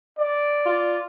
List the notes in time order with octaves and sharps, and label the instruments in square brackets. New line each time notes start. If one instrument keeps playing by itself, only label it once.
[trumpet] D5
[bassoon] F4